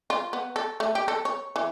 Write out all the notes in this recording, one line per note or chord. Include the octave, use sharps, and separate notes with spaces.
F4
B3
A4
A3
G4
A4
C#5
E3